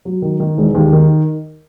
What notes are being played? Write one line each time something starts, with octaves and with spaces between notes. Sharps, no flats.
F#3
D#3
D#3
E1
D#2
D#3